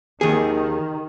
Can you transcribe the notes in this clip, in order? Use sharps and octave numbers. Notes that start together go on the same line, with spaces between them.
D#2 D#3 G#4